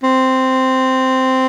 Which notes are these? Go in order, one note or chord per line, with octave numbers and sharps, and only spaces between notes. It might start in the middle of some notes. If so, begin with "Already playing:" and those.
C4